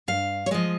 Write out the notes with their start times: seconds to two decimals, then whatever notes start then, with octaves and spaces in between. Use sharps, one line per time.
0.08 G2 F5
0.46 C#5
0.51 F3 G#3 D#5